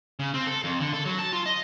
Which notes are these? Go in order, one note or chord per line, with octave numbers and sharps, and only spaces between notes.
C#3
C4
A4
F2
D3
A4
F#3
A5
F4
D#5